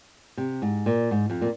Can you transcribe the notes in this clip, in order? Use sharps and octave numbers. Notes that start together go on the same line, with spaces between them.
C3
G#2
A#2
G#2
F2
A#2